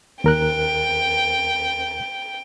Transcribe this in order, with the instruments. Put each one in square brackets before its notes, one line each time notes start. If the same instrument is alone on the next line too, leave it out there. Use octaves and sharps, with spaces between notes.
[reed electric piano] D#2 A#4 F#6 [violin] G5